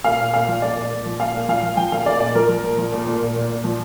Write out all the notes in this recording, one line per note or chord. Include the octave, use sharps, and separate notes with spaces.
A#2 F5
A#2
A#2 F5
F3
A#2 D5
A#2
A#2
F3
A#2 F5
A#2
F3 F5
F3
F3 G5
A#2 F5
A#2 D5
A#2 D5
F3 A#4
F3
A#2
F3
A#2
A#2
A#2
A#2
A#2
F3